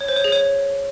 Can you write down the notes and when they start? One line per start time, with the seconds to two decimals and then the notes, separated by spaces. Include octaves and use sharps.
0.01 C#5
0.08 C5
0.16 C#5
0.24 G#4
0.32 C#5